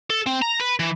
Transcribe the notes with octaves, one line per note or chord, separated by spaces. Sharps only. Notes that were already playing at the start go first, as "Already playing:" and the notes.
A4
C4
A#5
B4
E3